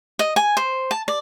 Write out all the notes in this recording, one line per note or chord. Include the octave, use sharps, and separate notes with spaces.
D#5
G#5
C5
A5
D5